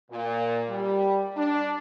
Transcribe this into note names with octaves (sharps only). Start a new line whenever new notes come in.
A#2
G3
D4